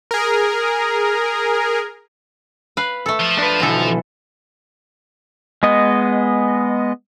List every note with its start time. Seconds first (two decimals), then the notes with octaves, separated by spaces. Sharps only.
0.11 G#4 A#4
2.77 B4 F5
3.06 A3 A4
3.20 F3
3.38 D4 B4
3.60 B1 B2 D3 E3 A4
5.63 G#3 B3 D#5